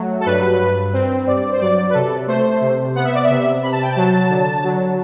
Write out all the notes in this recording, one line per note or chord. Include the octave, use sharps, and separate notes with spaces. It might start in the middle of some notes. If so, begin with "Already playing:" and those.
Already playing: F#3 A3
A4
G2 B4
G2
C4
G2 D5
C5
F#3 D5
B4
C3 A4
A3 C5
C3
B3 F#5
E5
D5
E5
C3
C3 B5
A5
G5
F#3 A5
D3
F#3